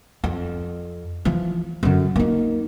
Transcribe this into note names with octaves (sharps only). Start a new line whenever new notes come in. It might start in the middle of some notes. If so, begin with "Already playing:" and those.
F2
E3 F3
F#2 D3
A#3 D#4